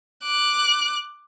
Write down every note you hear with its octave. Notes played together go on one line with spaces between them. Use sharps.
D6 F#6